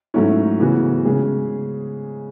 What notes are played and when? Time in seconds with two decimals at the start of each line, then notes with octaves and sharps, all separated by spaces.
0.14 G#2 F#3 A3 C#4 E4
0.60 C#3 E3 B3 F#4
1.05 C#3 G#3 C#4 G#4